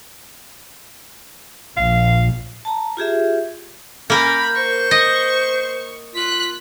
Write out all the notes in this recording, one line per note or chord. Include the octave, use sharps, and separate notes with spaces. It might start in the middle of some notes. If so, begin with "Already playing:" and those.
A#1 F5
A5 A#5
F4 G4 G#4 E5
A#3 C#4 A#4 B5 G6
C5 C#6
D#5
F4 F#6 B6